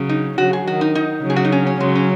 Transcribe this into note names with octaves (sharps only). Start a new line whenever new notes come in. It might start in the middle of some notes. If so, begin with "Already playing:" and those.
Already playing: C#3 F#3
D#4
C#3 F#3 F#4
G#4
D#3 F#4
D#4
D#4
C#3 F#3
G#4
F#4
D#4
C#4
C#4
C#3 F#3 G#3
C#4